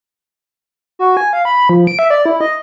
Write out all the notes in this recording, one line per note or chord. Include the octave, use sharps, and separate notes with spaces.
F#4
G#5
F5
B5
F3
D7
E5
D5
E4
D#5